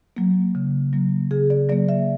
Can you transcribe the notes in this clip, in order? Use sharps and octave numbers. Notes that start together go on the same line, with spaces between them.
F#3 A#3
C#3
F#3 A#3
C#3 G#4
D5
F#3 A#3 D5
E5